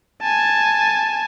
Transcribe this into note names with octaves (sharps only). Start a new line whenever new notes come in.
G#5 A5